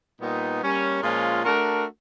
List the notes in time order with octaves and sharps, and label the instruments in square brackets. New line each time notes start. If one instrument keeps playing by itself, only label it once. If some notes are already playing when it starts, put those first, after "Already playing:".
[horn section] A#2 G3 B3 D#4
G3 A#3 C#4
A#2 F3 G#3 C#4 F4
A3 D4 F#4 A#4